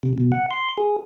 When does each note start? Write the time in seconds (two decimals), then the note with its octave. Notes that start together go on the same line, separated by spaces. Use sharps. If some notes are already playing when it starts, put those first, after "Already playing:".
0.03 C3
0.18 B2
0.32 F#5
0.51 C6
0.78 G#4